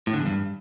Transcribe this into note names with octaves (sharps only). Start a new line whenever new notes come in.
A2
D3
E2
G2